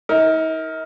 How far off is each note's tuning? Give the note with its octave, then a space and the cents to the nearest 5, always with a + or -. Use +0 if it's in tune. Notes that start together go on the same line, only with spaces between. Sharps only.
D#4 +45 A#4 +0